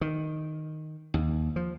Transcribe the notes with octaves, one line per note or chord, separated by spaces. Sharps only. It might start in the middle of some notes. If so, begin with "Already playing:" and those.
D#3
D#2
F3